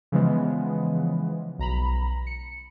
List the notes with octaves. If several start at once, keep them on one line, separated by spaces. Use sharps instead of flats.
C#3 E3 F3 G#3 B3
B1 A#5 B5
C#7